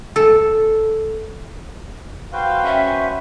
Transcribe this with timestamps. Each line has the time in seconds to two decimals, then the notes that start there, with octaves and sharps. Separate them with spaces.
0.16 A4
2.33 F#4 B4 C5 F5 G5
2.65 C#4 E5